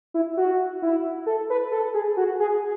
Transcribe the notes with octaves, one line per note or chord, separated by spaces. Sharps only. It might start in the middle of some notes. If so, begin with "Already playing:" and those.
E4
F#4
E4
A4
B4
A4
G#4
F#4
G#4